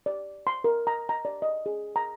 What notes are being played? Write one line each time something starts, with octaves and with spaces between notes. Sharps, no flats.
D5
C6
A#4
A#5
A#5
D5
D#5
G#4
A#5